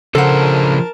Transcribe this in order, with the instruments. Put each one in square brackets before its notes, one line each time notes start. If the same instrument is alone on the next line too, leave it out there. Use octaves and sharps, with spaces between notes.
[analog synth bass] C#3 [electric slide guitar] F3 D4 C5 [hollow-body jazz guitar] A4 F#5 [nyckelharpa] A#4 A5